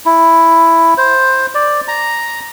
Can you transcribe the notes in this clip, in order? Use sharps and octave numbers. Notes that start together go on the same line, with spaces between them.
E4
C5
D5
A#5